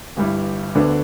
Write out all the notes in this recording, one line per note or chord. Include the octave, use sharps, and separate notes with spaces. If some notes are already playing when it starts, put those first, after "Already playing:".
G1 G2 G3 E4
D2 D3 B3 D4